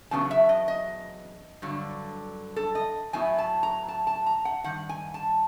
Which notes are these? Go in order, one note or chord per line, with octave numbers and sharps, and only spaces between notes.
E2 C#3 F#3 B3 D4 A5
E5
D#5
D#5
G2 D3 F#3
A4
D#5
A2 F#3 B3 E4 G#5
A5
A#5
A5
A5
A#5
F#5
G2 D#3 F#5
G#5
A5